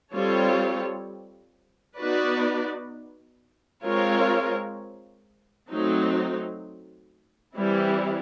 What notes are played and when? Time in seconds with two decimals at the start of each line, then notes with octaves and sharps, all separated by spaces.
0.12 G3 C4 F4 A4 C#5
1.98 B3 D#4 F#4 B4 D5
3.84 G#3 C4 F4 A#4 C#5
5.69 F#3 A3 C4 D#4
7.55 E3 G3 C4 E4